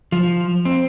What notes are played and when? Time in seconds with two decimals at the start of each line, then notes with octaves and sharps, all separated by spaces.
0.12 F3
0.65 C4